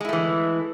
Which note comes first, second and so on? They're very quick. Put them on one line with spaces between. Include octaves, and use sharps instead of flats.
G#3 E4 A3 E3